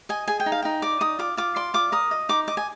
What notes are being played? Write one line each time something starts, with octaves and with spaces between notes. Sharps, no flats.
D#5 G#5
G#4 G#5
G5
D#4
F5
D#4 G5
D5 D6
D#4 D#6
F4 D6
F4 D6
D5 C6
F4 D6
A#4 D#6
D#5
D#4 D6
D#5 D6
G#5